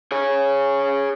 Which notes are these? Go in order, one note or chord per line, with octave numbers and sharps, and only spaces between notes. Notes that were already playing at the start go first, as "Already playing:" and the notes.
G#4 C#5